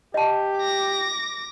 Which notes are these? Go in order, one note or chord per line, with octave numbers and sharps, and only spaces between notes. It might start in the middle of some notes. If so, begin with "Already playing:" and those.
G4 D#5 A5
D6 A#6